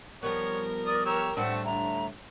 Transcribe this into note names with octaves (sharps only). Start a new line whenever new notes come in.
F3 G3 B3 A#4 C#5
D5 D#6
G4 C#5 A#5 E6
A2 G3 A3 C4 D4 F#5 E6
D3 E5 A#5